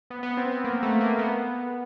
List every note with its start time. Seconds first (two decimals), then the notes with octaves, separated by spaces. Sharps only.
0.10 B3
0.23 B3
0.37 C4
0.51 B3
0.64 A#3
0.83 A3
1.00 A#3
1.19 B3